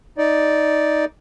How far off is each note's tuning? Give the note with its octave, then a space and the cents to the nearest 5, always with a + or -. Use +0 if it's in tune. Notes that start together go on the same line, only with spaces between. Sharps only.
D#4 +5 D5 -5